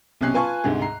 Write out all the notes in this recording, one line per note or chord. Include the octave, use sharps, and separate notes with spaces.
B1 C3 C#4 F#6 C7
F4 B4 G#5 A5 C#6
D2 G#2 C3 G#4
A#5 C7